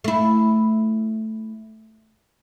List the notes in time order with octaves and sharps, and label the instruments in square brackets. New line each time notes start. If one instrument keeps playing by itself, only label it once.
[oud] A3 E4